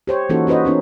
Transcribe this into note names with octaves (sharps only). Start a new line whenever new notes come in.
G4 C5 C#5
E3 A#3 C#4 D#4 F#4 A4
C#4 F#4 B4 C5 D#5
B3 C#4 D#4